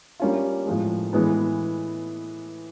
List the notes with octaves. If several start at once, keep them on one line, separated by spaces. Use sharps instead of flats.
G3 A#3 C#4 F4
A2 F3 G#3
A2 E3 G#3 B3